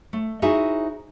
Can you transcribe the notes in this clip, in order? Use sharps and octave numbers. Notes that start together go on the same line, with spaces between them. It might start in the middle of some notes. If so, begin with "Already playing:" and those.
A3
D#4 E4 F#4 G#4 C5 E5